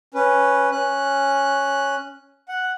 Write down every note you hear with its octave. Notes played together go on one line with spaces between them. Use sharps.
C#4 B4
C#4 F#6
F#5